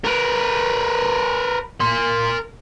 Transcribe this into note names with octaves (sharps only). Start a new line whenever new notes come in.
A#4 B4
A#4 C6